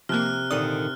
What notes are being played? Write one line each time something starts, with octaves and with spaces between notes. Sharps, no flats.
C3 F3 A#3 F6 F#6
A#2 D3 D#3 D5 D#6